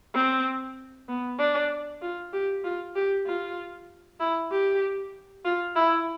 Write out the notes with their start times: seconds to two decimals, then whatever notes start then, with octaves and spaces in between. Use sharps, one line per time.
0.15 C4
1.08 B3
1.39 D4
2.02 F4
2.33 G4
2.64 F4
2.96 G4
3.26 F4
4.20 E4
4.51 G4
5.45 F4
5.76 E4